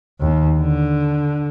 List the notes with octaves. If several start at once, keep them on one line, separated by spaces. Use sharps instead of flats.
D#2
D3